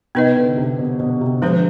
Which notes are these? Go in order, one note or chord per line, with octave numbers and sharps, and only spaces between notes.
C3 B3 D#4 B4 D#5
D3
C3
B2
B2
C3
D3 F3 G#3 D4 G4 C5